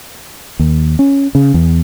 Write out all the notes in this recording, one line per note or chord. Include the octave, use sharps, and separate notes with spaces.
D#2
C#4
C#3
E2